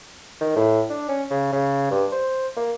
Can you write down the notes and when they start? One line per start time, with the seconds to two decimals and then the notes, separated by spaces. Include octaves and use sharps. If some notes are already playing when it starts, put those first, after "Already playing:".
0.41 D#3
0.56 A2
0.90 D4
1.09 C#4
1.31 C#3
1.53 C#3
1.91 G2
2.12 C5
2.57 A#3